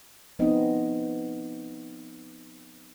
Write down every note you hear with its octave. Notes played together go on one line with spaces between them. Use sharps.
F3 B3 C4 D#4 D#5